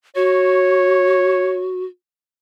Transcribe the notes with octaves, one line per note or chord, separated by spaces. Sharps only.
F#4 C#5